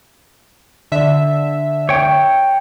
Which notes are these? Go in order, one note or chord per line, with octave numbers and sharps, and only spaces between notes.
D3 E5
C#5 G5